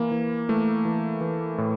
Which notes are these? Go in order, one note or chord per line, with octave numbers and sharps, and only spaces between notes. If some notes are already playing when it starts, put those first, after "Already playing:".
Already playing: E3 A#3
E3
E3 A3
E3
E3
A2